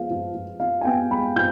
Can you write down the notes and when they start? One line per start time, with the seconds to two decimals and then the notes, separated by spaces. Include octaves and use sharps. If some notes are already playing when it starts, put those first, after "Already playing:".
Already playing: F3 G#3 B3 F5
0.10 F3
0.34 F3
0.60 F3 F5
0.81 G#5
0.85 B3 G5
1.10 G#3 B5
1.36 F3 G6